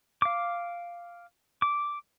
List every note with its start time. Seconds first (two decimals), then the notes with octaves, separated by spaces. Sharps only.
0.22 F5 D6
1.62 D6